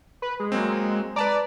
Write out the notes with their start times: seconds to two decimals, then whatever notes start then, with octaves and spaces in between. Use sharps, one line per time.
0.22 B4
0.40 G#3
0.52 F#3 A#3 C4
1.16 B4 D5 A5 A#5